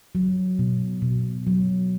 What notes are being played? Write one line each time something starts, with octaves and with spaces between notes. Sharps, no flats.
F#3
B2
B2
F#3